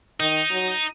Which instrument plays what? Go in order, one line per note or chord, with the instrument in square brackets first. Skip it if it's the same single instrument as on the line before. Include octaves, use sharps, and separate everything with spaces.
[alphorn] D#3 [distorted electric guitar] D#4
[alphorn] F#3